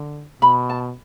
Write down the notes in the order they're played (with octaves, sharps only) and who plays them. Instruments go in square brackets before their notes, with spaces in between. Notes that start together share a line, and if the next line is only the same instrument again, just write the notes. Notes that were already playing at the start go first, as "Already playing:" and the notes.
Already playing: [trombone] D3
[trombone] B2 [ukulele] B5
[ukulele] A5